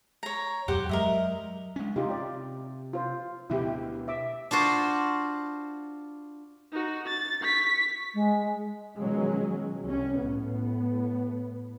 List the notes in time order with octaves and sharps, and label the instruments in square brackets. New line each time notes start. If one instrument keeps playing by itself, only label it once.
[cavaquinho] C#5 A#5
[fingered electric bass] E1 F#2 [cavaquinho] G4 C5 F#5
[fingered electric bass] F#3 G#3 [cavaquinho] A#4 D#5 E5
[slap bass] G#3 C#4
[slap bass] C3 [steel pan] D#4 F4 G4
[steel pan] D5
F4 C5
[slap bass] D2 B2 [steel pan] E4 G4
[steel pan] E5 D6
[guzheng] D4 F4 F#4 C5
[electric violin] D#4 F#4
A6
C#6 B6
[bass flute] G#3
[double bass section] B2 D#3 F3 F#3 G#3 C#4
C2 C#4
A2 B3